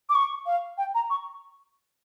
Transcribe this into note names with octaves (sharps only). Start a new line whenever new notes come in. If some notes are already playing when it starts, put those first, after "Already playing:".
D6
C#6
F5
G5
A#5
C#6